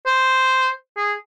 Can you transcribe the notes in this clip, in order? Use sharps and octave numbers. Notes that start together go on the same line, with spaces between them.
C5
G#4